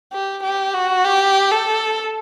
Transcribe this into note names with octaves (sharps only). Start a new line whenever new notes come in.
G4
G4
F#4
G4
A4